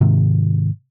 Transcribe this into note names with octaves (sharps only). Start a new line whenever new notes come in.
G#2 C3 D#3